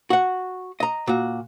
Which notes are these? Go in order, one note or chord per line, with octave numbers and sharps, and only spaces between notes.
F#4 F#5
D#5 A#5
A#2 F#4